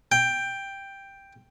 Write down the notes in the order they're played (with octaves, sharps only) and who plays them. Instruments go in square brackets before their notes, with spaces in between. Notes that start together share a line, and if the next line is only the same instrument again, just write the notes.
[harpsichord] G5